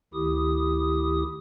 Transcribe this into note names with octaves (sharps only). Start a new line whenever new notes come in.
D2 D#3 E4 G4 D#6